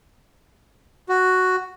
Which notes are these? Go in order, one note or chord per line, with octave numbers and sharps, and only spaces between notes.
F#4